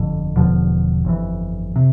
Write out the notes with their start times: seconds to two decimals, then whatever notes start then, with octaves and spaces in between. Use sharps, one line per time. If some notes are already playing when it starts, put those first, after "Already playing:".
Already playing: G1 F2 D3
0.36 E1 E2 D3 F3
1.05 G1 F2 E3
1.76 C3